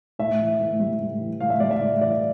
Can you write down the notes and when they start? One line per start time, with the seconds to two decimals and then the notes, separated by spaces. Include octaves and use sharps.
0.19 A2 E5
0.39 E3
0.60 A2
0.79 G3
1.00 A2
1.20 E3
1.40 A2 F5
1.50 E5
1.60 G3 D5
1.71 E5
1.81 A2
2.01 E3 D5